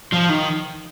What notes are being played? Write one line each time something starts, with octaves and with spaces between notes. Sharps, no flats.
F3
D#3